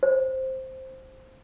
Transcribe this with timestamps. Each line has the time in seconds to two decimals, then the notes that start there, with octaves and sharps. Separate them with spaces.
0.03 C5